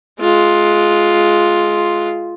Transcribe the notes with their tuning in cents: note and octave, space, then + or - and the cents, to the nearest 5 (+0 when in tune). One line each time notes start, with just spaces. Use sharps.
G#3 +20 F4 +0